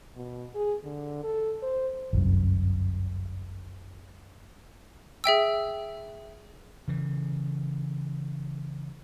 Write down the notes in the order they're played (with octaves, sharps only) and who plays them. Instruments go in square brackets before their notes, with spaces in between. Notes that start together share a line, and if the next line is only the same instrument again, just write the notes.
[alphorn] B2
G#4
D3
A4
C5
[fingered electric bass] G1 C2 F#2
[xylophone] G#4 E5 G5 E6
[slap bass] C#3 E3